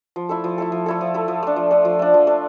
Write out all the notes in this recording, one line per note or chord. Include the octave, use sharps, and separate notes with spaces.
F3
A3 E4 A4
F3
A3 E4 A4
F3
A3 E4 A4
F3
A3 E4 A4
F3
A3 D4
F3
A3 D4
F3
A3 D4
F3
A3 D4